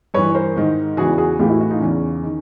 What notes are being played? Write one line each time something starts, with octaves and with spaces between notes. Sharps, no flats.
G2 E3 B4 C#5
A#4 C5
G#2 D#3
E2 C#3 E3 F#4 G#4
F#4 G#4
A2 E3 F4 G4
E4 F#4
E4 F#4
D#4 F4
E2 C#3 E3 C#4 D#4
D#3